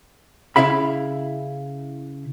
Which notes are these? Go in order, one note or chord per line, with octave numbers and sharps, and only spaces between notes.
C#3 E4 E5 F5 B5